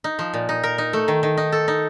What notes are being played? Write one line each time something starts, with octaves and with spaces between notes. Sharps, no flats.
D#4
F3
A#2
D#4
A#4
D#4
A3
D#3
D#3
D#4
A4
D#4